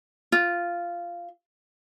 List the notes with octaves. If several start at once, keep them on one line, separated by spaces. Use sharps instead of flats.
F4